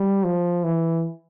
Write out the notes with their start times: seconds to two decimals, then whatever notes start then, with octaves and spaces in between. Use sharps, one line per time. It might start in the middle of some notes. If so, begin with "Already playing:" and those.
Already playing: G3
0.24 F3
0.64 E3